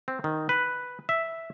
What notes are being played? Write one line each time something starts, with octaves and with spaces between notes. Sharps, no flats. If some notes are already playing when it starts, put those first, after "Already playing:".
C4
D#3
B4
E5